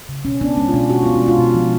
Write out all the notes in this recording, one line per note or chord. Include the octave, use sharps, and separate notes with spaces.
C#3
B2 C#4
B3 D4
G#3 C#4
F4
B2 D4
B2 F#4
B3 F4
D4
G#3
F4
B2
F3